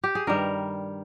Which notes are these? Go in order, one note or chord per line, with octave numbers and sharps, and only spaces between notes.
G4
G#4
G2 D#3 G3 A#4